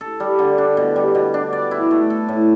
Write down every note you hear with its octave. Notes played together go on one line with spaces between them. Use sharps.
A4
G3
D3
D4
B2
G3
B2
D4
D5
E4
A3
A4
A2